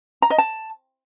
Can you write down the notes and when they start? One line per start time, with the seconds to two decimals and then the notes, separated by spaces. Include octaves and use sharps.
0.22 A#5
0.30 D#5
0.38 A5